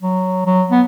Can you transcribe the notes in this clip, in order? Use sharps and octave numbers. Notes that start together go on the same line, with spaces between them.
F#3
F#3
B3